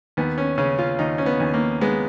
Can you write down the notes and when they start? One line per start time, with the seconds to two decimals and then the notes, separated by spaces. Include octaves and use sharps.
0.17 D#2 B3
0.38 C#4
0.58 C#3 C#4
0.79 F4
0.99 D#2 D#4
1.18 C#4
1.26 B3
1.40 D#2
1.54 A#3
1.81 G#3 B3